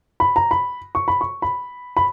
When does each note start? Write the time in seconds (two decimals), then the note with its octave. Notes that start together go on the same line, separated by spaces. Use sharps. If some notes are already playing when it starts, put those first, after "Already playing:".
0.20 B5
0.36 A#5
0.51 B5
0.95 C#6
1.08 B5
1.21 C#6
1.42 B5
1.97 B5